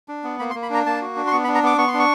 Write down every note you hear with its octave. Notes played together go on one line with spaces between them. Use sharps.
D4
B3
A#3 B5
C6
A#3
B5
D4 A#5
A#3 A5
F#4
D4
C6
B3 C#6
B5
D4
A#5
B3 D6
B3 C#6
C6
D4
C#6